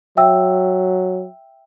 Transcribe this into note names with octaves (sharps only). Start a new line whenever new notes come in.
F#3 E5 G5 E6